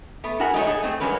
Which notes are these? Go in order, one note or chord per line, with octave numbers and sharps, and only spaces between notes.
A3 B3
E4 F#4 G#4 A#4 F#5
G#3 A3 D#4 C#5
G#4 A4 F#5 G#5
A3 C4
G2 F#3 G#3 C#4 A#4 B4